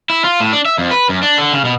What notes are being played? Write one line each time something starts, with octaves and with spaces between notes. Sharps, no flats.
E4
F4
A2
D4
E5
F2
B4
F#2
D4
D3
C#3
B2